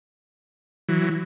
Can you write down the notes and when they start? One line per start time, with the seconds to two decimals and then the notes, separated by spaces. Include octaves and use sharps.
0.89 E3 F#3